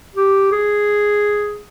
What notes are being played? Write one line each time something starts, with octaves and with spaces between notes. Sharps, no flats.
G4
G#4